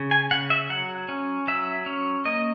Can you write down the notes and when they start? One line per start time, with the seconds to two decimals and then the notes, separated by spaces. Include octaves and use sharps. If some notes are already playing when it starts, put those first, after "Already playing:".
Already playing: C#3
0.11 G#5
0.31 C#3 F#5
0.50 E5
0.70 F#3 F#5
1.09 C#4
1.47 F#3 E5
1.86 C#4
2.25 A#3 D#5